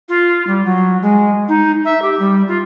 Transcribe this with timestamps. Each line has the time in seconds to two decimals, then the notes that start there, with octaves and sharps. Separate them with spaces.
0.08 F4
0.46 G3
0.64 F#3
1.02 G#3
1.48 D#4
1.85 E5
2.02 G4
2.19 G3
2.47 F4